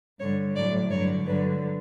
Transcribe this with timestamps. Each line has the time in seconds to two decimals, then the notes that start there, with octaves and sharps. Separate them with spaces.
0.20 G2 D3 G3 C#5
0.56 A2 F#3 D5
0.91 G2 D3 F#3 C#5
1.26 G2 D3 F#3 B4